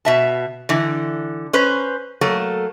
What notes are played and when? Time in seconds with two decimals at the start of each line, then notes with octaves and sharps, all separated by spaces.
0.05 B2 E5 A5
0.69 D3 E3
1.53 C#4 B4 C5
2.21 F#3 A3 A#3 A4